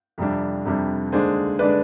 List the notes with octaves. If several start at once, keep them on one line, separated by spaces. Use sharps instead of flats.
F2 C3 G3 D4
F2 C3 G3 D4
D#2 D3 G#3 D4 G#4 C5
D3 G#3 D4 B4 D5